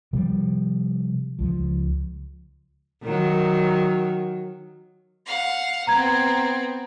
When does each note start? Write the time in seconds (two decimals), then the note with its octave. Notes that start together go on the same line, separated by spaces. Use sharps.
0.13 C3 F3 G3
1.39 C#2 F3
3.03 D#3 F#3
5.26 F5 F#5
5.87 B3 C4 A#5 G#6